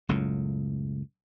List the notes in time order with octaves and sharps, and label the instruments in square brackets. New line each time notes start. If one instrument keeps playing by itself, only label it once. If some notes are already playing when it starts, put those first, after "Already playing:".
[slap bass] F#1 C#2 A2